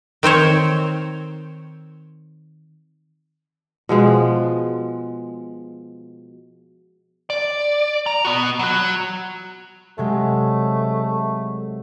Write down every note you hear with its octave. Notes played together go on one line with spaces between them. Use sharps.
D#3 C4 C5 C#5
B2 F3 G#3
D5
A#5
B3 F#4
F#3 F#4
C3 F#3 G#3 A3